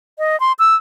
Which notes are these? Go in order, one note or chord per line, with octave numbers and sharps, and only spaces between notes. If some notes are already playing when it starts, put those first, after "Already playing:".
D#5
C6
E6